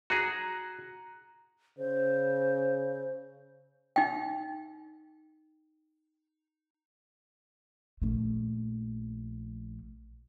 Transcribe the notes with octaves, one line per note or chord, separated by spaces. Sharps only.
F#4 G#4 A#5 F#6 A#6
C#3 C5
D#4 G5
A#1 A3